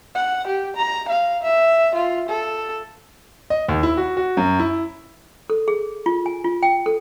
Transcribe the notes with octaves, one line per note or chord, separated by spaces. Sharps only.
F#5
G4
A#5
F5
E5
F4
A4
D#5
D#2
E4
F#4
F#4
F#2
E4
A4
G#4
F4
G#5
F4
G5
A4